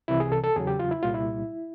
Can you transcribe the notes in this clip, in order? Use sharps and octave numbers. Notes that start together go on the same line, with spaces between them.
C2 C3 E3 E4
G#4
A4
A4
E2 C#3 F#3 G#4
G4
F4
E4
C2 A#2 G3 F4
E4